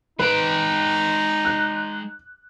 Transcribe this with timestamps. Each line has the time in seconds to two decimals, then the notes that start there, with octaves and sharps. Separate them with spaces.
0.19 G#3 D#4 B4 G5
1.45 F#6